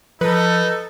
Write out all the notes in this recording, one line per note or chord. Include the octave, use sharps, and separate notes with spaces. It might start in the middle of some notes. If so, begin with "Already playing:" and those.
F3 D#4 A4 B4